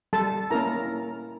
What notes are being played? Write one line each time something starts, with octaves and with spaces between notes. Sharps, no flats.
G3 A4 A5
A#3 C#4 E4 A#4 A#5